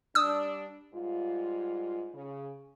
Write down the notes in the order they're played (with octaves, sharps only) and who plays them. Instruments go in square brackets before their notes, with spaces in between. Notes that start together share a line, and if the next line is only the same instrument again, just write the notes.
[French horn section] G3 D4 [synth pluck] D#6 E6
[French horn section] G#2 G3 F4
C#3